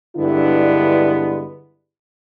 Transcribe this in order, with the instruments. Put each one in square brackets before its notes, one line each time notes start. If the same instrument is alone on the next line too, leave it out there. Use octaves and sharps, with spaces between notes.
[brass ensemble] G2 D3 G#3 B3 D4 E4